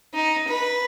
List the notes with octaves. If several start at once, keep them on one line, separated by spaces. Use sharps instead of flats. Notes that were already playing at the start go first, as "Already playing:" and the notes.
D#4
B4